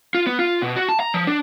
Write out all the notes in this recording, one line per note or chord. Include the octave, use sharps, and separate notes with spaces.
F4
B3
F4
B2
F#4
A5
A#5
F3
D4